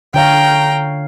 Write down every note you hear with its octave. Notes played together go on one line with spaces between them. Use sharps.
D3 C#5 F5 G5 A#5